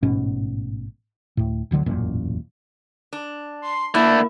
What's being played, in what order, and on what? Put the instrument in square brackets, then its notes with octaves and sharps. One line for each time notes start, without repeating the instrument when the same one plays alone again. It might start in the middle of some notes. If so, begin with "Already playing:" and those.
[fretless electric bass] A1 G#2 B2 C#4
D2 A2
D1 D2 D3 F#3
E1 A1 F#2 A#2
[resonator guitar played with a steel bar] D4
[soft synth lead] C6
[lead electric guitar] D3 A3 [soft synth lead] A#3 [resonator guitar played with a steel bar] E4